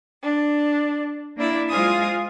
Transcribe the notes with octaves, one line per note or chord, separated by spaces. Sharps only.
D4
A#3 D4 E4 D5 E5
G#3 F4 C5 F5 G#5 D#6